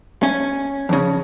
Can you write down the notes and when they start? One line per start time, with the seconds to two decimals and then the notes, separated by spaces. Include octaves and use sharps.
0.23 C#4
0.89 F2 C#3